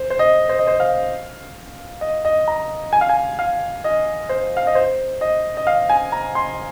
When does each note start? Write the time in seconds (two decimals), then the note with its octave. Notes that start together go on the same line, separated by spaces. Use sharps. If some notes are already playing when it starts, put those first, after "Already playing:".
Already playing: C5
0.10 C5
0.19 D#5
0.49 C5
0.59 D#5
0.67 C5
0.80 F5
2.01 D#5
2.25 D#5
2.48 A#5
2.93 G#5
3.01 F5
3.09 G#5
3.39 F5
3.84 D#5
4.29 C5
4.57 F5
4.67 D#5
4.75 C5
5.21 D#5
5.57 D#5
5.67 F5
5.89 G#5
6.12 A#5
6.35 C6